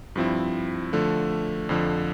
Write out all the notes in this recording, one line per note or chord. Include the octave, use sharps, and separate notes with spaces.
G2 F3 C4 E4
D3 F3 A3
F2 D3 F3